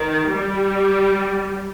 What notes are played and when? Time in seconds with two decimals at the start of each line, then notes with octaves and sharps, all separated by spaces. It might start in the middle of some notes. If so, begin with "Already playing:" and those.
Already playing: D#3
0.30 G3